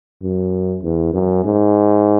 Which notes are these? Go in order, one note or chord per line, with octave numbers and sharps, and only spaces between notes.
F#2
E2
F#2
G#2